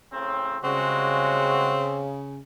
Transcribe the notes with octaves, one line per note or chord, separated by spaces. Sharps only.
A2 C#3 C4
C#3 G3 G#3 C4 F#4